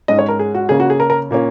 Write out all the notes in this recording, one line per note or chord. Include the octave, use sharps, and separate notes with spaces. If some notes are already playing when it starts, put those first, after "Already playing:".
G#2 G#3 C#4 D#5
C#5
A#4
G#4
F#4
C#3 A#3 C#4 G#4
F#4
G#4
A#4
A#4
A#2 A#3 C#4